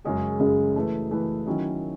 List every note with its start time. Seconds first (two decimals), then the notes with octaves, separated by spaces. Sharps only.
0.05 F#2 C#3 G#3 C#4 G#4
0.39 F#2 C#3 G#3 C#4 G#4
0.75 E3 A3 E4 B4
1.11 E3 A3 E4 B4
1.46 D#3 F#3 C#4 E4